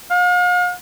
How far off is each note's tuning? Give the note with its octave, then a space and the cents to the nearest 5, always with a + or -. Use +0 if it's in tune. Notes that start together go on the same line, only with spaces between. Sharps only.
F5 +45